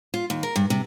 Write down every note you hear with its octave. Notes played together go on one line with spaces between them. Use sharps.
F4
D#2
A#4
G2
C3